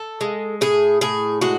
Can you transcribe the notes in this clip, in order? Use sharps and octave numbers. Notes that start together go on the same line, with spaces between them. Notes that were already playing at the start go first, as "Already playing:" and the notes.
Already playing: A4
G#3
A2 G#4
A2 G#4
G#3 F#4